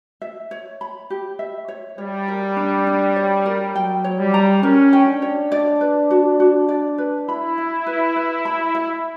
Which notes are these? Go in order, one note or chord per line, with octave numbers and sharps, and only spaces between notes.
E5
C#5
B5
G4
E5
C#5
G3 C#5
A#4
D4
D4
C#5
A#4
F#3 G5
C#5
G3
A#5
C#4 A#4
G5
D4
C#5
D5
B4
F#4
F#4
D5
B4
E4 B5
E5
B4
B4
B5
E5